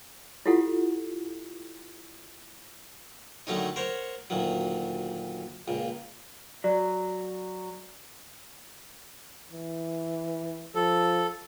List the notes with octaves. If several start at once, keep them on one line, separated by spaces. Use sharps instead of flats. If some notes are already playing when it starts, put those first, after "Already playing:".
E4 F4 G4 A4 F#5
D3 D#3 F#3 A3 C#4 D#4
A#4 C5 C#5 F#5
D2 A#2 D#3 F#3
C#2 A#2
F#3 D5
E3
F3 A4